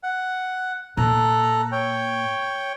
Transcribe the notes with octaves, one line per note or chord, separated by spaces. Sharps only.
F#5
A#2 A4 A#5 F#6
C#5 G5